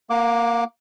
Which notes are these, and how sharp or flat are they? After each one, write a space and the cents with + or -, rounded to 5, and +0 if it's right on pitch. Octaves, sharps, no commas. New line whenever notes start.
A#3 +0 F#5 -35 D6 +0